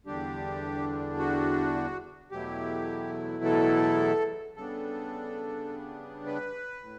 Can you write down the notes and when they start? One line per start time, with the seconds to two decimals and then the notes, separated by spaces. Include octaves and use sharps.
0.06 E2 D3 G3 D4 G4
1.18 F#4
2.32 E2 B2 F#3 A3 E4 G4
3.44 A4
4.57 C#3 G3 B3 D4 A4
6.26 B4
6.83 A2